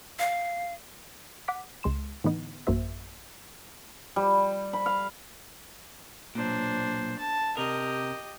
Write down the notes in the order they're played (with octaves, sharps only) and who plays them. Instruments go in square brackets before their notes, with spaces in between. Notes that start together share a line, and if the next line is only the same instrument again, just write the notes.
[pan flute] F5
[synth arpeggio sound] F#5 D6 B6
C#2 G#3 C6 E7
A2 D3 E3 B3 D#4
A1 F#2 A#3 F#4 C5 E5
[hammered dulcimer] G3
B5
F5
[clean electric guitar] B1 A#2 [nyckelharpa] D4 C5
[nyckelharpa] A5
[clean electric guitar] C3 A#4 [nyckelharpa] G4 D#5